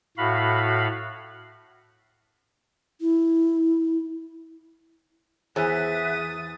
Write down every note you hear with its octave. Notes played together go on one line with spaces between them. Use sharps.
A2 F#4 F5 B5
E4
E2 G#4 C5 E5 D#6 E6 F#6 A6